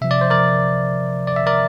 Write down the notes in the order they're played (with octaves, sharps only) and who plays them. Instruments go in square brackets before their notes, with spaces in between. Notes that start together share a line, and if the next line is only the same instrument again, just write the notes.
[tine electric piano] C3 F3 E5
D5
C5
A#4 D5
D5
E5
A#4 D5